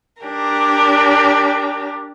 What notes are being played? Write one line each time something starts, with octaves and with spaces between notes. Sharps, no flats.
D4 G4 A#4